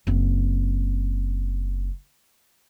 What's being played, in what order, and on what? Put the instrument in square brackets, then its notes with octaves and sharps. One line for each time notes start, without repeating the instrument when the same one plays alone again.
[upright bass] F#1 C4